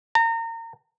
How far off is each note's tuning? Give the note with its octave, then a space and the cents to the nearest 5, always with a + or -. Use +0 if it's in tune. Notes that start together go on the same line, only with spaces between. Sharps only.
A#5 -30